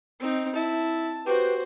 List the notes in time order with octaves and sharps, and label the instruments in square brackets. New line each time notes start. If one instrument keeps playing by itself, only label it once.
[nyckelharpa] C4 D#4
[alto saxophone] E4 [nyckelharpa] A5
[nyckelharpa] F#4 C5 [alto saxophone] G4 [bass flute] B4